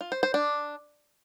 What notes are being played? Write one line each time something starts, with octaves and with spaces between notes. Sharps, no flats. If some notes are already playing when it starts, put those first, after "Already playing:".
F4
C5
C5
D4